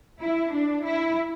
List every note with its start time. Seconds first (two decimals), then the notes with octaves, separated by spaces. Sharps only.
0.21 E4
0.53 D4
0.85 E4